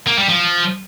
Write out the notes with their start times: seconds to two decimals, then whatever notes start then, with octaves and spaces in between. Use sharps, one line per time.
0.07 A#3
0.18 G3
0.30 F3